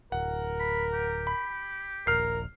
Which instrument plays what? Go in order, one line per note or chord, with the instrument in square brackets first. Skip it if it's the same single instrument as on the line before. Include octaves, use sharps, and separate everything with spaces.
[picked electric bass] D1 [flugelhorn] A#4 [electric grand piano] F#5
[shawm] B5
G4
[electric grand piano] B5
[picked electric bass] D#1 A#1 [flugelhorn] A#4 [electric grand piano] F6 C7